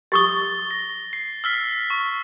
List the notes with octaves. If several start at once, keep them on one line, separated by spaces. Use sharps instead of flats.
G4 C#6 D#6 A6 G7
A#6
C7
E6 F6 B6
C#6